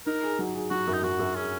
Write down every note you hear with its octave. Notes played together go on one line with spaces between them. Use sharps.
D#4 A#4
G#4
F#3
G#4
F#3 F#4
F#2
D#4
F#2 F#4
F#2
C#4 G#4